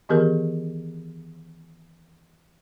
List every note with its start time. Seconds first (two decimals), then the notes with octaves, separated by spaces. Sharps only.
0.09 D#3 E3 B3 G4 G#4 A#4